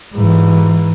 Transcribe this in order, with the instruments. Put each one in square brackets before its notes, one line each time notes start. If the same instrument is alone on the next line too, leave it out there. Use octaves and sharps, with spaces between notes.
[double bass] G#2 E3